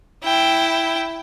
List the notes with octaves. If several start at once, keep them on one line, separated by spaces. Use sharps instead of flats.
E4 G5